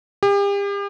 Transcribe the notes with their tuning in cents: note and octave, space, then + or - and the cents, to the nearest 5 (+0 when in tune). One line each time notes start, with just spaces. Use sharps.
G4 +40